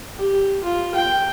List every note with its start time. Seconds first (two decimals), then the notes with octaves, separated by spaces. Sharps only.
0.16 G4
0.63 F4
0.94 G5